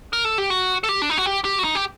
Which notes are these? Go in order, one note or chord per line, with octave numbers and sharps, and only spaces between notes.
A#4
A4
G4
F#4
A4
G4
D4
D#4
F#4
G4
G4
F#4
D#4
G4